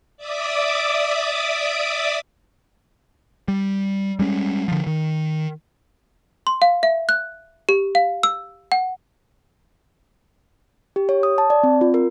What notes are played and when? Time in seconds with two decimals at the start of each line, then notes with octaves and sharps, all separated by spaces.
0.17 D5 E5 D6 D#6
3.48 G3
4.19 G3 G#3 C#4
4.68 D3 F3
4.87 D#3
6.47 C6
6.62 F5
6.83 E5
7.09 F#6
7.69 G4
7.95 F5
8.23 E6
8.72 F#5
10.96 G4
11.09 C#5
11.23 D#6
11.38 A5
11.50 D5
11.63 C4
11.81 F4
11.94 A#4